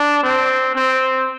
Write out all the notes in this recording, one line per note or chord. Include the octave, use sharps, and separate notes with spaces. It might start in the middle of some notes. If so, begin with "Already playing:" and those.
Already playing: D4
C4
C4